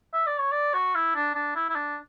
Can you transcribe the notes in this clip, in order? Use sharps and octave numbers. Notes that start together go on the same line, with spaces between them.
E5
D5
C#5
D5
F#4
E4
D4
D4
E4
E4
D4